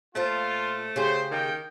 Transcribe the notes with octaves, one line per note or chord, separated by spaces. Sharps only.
A#2 A3 F4 C5 A5
C#3 G4 G#4 C5
D#3 A#3 D#4 G5